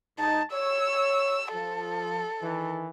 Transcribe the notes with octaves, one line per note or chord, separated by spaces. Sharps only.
G#2 D#4 A5
C#5 E6
F3 A4
D#3 E3